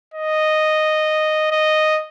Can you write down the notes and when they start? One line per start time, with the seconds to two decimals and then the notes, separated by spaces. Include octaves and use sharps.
0.14 D#5
1.52 D#5